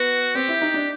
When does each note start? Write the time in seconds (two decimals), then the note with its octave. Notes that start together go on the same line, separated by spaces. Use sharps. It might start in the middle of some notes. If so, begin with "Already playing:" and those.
Already playing: B3 F#4
0.35 C4 G4
0.49 E4
0.62 D#4
0.74 D4